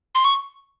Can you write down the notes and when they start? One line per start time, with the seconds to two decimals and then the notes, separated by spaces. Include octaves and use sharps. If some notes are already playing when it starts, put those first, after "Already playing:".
0.15 C6
0.24 C#6